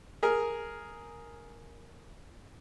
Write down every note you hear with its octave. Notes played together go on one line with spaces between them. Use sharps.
G#4 A#4